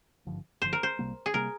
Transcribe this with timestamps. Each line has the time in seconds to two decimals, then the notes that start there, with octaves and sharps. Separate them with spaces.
0.26 G#1 G2 D3 F3
0.62 G#1 G2 D3 F3 C5
0.73 A#4
0.83 C5
0.99 C2 C3 G3 A#3
1.26 G#4
1.34 C3 G3 A#3 A#4